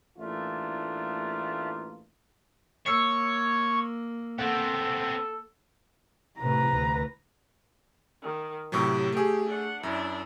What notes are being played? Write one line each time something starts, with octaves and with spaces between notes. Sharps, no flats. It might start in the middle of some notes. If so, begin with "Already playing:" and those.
A1 E3 A3 A#3 D4 F4
A#3 C#5 E6 C7 C#7
B3 C4 A4 F#5
A2 C3 B4 A#5
D2
D#3
A2 C3 F#3 G4
A3 G4 G#4
D4 F#5
F#2 D4 E4